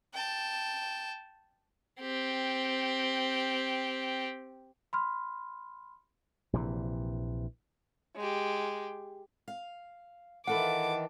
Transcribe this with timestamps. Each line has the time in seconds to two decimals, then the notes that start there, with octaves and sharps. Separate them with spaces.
0.14 G5 A5
2.00 C4 G4
4.93 B5 C6 F6
6.53 A#1 C3 E3
8.16 G#3 G4
9.48 F5
10.47 D#3 E3 F4 A4 B4 F#5 A5 D6